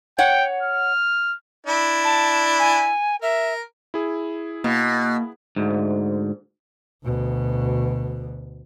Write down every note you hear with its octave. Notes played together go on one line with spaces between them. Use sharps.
C#5 F#5 G5
F6
D4 E4
A5
G#5
A#4 E5
E4 G#4
B2 A#3
D2 G#2
D2 B2